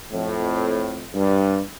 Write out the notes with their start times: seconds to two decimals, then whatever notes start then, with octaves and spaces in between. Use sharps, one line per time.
0.12 F2 A2
1.15 G2